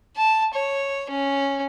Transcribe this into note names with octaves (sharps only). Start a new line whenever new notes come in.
A5
C#5
C#4